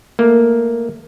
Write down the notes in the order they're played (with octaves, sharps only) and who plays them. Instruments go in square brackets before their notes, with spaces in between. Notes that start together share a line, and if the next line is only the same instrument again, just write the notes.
[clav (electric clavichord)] A3 A#3